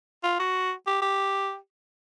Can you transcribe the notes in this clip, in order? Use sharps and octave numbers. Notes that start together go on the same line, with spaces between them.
F4
F#4
G4
G4